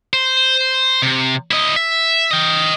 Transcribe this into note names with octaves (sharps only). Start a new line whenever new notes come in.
C5
C3
E4 D#5
E5
D#5 G5